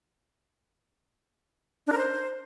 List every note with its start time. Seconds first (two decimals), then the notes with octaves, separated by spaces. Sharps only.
1.87 D4
1.92 A#4
1.97 C5